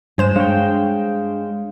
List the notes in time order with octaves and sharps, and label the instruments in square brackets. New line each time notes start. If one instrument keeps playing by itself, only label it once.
[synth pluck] G2 C5 E7 [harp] G#3
[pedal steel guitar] G#3 G5 [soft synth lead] D4 [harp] C#5 F5